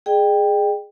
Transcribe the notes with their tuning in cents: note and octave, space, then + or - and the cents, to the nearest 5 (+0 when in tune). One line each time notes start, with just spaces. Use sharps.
G#4 +0 D#5 -45 G5 +10